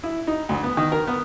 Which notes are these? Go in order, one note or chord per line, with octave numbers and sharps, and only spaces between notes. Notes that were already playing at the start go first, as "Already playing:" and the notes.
E4
D#4
D2
B3
D#3
A#4
B3